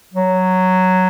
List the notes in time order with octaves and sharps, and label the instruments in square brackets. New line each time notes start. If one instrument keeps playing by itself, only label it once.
[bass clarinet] F#3